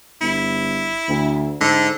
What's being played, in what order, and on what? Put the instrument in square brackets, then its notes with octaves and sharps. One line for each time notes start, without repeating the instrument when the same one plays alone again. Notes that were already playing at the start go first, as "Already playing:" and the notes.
[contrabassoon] G1 [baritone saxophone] E4
[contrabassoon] D2
[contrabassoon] G#2 [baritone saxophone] D3